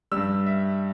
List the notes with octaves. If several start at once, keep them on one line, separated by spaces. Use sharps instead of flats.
G2 G3 E6
E5